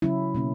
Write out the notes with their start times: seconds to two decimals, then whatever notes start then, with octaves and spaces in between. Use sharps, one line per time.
0.02 C#3 F#3 C#4 E4
0.35 B2 A#3 C#4